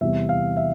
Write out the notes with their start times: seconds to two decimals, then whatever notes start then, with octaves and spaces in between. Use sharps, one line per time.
0.01 E2 C3 G3 E5
0.29 F5
0.57 E5